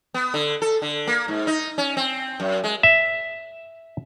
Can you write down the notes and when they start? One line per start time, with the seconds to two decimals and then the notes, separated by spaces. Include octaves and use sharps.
0.14 B3
0.34 D3
0.62 A4
0.82 D3
1.07 A#3
1.28 G#2
1.47 D#4
1.78 C#4
1.97 C4
2.40 F#2
2.64 G#3
2.83 E5